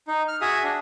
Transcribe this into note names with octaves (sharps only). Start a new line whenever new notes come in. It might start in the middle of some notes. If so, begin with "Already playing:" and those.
D#4
F6
F#4 G#4 E5 D#6
D4